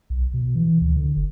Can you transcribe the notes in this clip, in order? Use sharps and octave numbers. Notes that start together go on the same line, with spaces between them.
B1
B2
E3
D2
D3
F#1